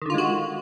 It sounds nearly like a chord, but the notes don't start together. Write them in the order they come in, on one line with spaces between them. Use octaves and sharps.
D#3 D3 F4 G#3 F#4